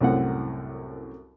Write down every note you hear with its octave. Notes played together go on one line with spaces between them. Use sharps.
C2 F#2 A2 C4 F#5